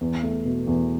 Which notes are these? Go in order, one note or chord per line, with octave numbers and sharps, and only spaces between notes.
E2
A3
B2
E2